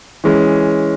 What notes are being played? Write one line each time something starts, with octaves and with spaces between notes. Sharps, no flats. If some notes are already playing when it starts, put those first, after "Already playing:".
E3 G#3 C#4